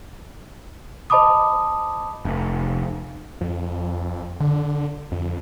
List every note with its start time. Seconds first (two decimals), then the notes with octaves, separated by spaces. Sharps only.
1.10 C5 D#5 A5 B5 D6 D#6
2.25 F1
3.41 F2
4.40 D3
5.12 F2